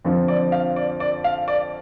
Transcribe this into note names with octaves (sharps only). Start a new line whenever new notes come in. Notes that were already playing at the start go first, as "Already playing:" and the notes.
F2 D3 F3 C4
D5
F5
D5
D5
F5
D5